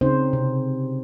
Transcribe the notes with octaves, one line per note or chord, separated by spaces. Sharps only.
C#3 C4 C#4 D#4 C5
C3